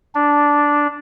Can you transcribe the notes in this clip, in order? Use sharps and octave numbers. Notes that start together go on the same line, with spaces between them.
D4